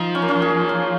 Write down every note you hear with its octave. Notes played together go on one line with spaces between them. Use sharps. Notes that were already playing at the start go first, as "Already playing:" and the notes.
Already playing: F3 D#4
C#4
A#3
C#4
G#4
F4